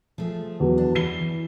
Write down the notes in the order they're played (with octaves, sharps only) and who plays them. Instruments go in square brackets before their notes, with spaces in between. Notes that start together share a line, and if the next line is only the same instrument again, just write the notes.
[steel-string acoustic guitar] F3 A3 G#4
[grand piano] E2 F#3
[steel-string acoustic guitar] D4
[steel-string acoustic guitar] E3 [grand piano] C7 G7